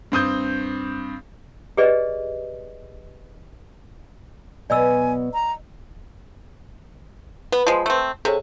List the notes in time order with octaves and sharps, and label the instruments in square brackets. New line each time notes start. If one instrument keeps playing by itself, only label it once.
[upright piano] G2 C4 D#6 G6
[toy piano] G4 G#4 B4 D5 D#5
[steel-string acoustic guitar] B2 F#3 B3 [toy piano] D5 D#5 E6 [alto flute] G#5
[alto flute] A#5
[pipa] B3 [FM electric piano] B4
[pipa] F3 G#3
A3 C4
[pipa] C3 [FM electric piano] G#4 A4 C#5